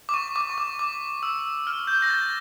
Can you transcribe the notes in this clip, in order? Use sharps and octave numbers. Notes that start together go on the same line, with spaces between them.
D6
C#6
D6
C#6
D6
D6
E6
F6
G6
A#6
A6